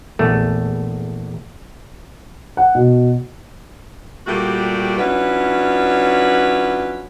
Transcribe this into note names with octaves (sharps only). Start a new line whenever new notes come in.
A#1 E2 A3
F#5
B2
A#2 G3 A3 F#4 G4
F#3 C#4 D4 E4 F4 B4